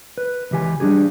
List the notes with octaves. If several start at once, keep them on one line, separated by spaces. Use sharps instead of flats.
B4
C#2 E3 G4 G#5
G3 D4 D#4 G4 G#4